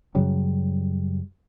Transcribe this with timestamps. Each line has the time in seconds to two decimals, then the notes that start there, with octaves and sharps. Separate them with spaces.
0.15 F#2 C#3 F#3 G3